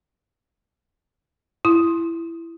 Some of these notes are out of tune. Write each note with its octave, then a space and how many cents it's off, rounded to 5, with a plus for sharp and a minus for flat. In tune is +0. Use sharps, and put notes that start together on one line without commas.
E4 +15 C6 +15